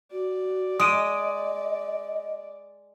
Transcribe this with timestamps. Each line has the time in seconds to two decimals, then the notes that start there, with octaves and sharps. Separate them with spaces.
0.12 F#4 D5
0.80 G#3 D#5 D#6 D7 D#7